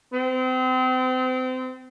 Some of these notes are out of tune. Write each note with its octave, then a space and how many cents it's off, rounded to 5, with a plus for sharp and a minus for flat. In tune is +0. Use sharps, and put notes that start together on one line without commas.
C4 -35